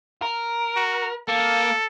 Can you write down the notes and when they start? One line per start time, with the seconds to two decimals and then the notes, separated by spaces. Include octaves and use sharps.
0.22 A#4
0.76 F#4
1.28 A#3 A4